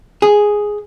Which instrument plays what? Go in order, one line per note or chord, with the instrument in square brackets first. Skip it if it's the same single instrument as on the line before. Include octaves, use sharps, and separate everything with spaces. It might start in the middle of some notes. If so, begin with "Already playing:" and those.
[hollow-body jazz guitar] G#4